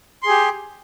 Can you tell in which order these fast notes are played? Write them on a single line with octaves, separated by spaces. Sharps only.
C6 G#4 G4